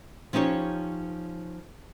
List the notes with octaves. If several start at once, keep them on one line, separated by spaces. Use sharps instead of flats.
F3 C#4 D#4 G4 C#5